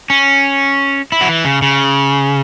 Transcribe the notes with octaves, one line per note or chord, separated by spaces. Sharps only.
C#4
E4
F#3
E3
C#3
C#3